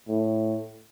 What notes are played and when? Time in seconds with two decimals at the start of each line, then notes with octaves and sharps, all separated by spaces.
0.08 A2